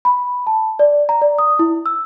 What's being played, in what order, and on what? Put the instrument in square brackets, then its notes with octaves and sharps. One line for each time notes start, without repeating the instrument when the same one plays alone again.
[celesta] B5
A5
D5
A#5
D5
D#6
E4
E6